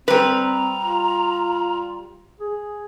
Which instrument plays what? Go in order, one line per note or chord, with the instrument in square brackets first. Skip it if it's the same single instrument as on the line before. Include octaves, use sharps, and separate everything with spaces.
[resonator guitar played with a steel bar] G3 B4 [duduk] C4 [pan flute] A#5
[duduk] F4
G#4